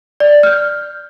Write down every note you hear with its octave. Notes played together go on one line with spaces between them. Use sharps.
D5
F6 G6